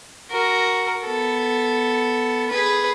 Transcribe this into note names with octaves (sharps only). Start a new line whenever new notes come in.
F#4 A#4
B3 A4
G#4 B4